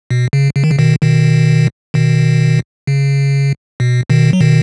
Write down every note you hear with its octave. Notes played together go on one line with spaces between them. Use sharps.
B2
C#3
C#3
D#3
C#3
B2 D#3
B2 D#3
B2 D#3
C#3
B2
B2 D#3
F#3
B2 D#3